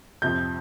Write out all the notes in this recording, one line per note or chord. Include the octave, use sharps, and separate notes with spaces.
F2 C3 F3 G6